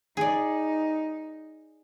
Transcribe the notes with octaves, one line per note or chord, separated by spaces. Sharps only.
D#4 G#4 D5